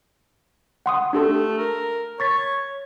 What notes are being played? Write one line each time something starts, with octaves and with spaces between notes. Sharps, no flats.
F#5 C6 D#6
A3 D4 G4 A4
A#4
C#5 C#6 A6 B6